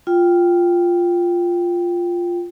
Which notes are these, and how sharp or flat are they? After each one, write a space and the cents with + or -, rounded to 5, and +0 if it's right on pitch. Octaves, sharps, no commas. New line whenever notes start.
F4 +0 G5 +0